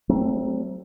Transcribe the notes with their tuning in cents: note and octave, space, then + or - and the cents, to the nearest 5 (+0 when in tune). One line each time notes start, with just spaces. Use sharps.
F#3 +40 A3 +0 C4 +0